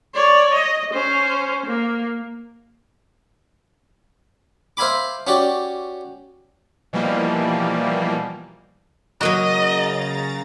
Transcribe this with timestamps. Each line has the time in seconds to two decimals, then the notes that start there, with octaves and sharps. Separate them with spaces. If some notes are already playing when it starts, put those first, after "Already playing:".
0.15 C#5 D5
0.54 D#5
0.93 C#4 C5
1.66 A#3
4.77 C5 E5 F5 G#5 B5 D6
5.27 C#4 F#4 G4 D5
6.93 B2 E3 F3 G3 A#3
9.21 C#3 F#3 A#3 F#4 D#5 A#5 A6